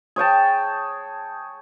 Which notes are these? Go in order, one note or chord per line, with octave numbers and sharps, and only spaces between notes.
G#4 C#5 G5 A5